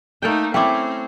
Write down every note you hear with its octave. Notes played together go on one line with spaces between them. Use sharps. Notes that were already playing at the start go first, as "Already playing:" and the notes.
A3 A#3 D#4 A4 G5
A3 C4 C#4 E4 G5 D6